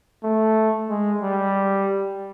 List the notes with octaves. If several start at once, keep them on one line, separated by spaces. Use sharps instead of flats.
A3
G#3
G3